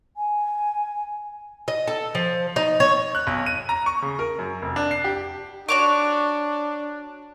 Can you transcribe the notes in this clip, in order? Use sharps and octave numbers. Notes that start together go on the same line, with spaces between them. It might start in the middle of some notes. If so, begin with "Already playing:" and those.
G#5
D#5
A4
F3
D#4
C#5
F#6
B1
D#7
A#5
C#6
C#3
A#4
F#2
F1
D4
C7
G4
D4 F#4 C#5 D6